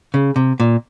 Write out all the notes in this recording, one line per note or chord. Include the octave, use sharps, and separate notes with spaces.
C#3
C3
A#2